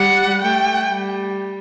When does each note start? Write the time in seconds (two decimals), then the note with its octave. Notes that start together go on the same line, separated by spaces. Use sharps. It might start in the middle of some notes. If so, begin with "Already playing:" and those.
Already playing: G3 F#5
0.42 A3 G5
0.91 G3